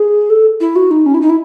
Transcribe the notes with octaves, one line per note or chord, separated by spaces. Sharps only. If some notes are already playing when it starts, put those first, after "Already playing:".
Already playing: G#4
A4
E4
F#4
D#4
C#4
E4
D#4
E4